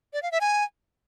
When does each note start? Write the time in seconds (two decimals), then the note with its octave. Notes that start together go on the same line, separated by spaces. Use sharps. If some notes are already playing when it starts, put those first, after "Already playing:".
0.13 D5
0.23 F5
0.32 E5
0.41 G#5